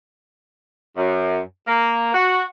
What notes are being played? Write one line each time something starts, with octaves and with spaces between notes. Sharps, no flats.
F#2
A#3
F#4